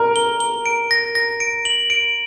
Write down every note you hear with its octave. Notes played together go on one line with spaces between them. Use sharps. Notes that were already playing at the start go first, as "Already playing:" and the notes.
Already playing: A#4
G7
G7
D7
A#6
A#6
D7
F#7
D7